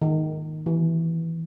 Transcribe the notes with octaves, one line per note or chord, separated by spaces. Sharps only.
D#3
E3